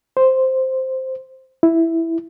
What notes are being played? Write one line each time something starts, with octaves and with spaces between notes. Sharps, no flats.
C5
E4